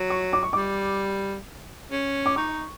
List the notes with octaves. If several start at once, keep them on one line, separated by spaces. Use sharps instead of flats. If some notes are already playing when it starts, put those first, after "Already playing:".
Already playing: F#3
C#6
D6
C#6
G3 D6
C#4
D6
D#4 C#6